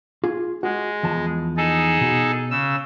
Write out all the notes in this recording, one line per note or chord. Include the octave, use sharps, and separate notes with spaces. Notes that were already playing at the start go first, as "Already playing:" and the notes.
F4 G#4
G#3 F#4
E2 F3 A5
D#4 G#4 A4
B2
C#3 E6